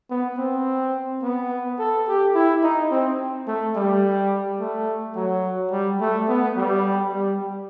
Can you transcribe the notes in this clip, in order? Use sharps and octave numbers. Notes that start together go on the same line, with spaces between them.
B3
C4
B3
A4
G4
E4
D#4
C4
A3
G3
A3
F#3
G3
A3
B3
G3
G3